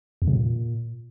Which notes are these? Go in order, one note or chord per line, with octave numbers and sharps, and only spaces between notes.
E2
C3
A#2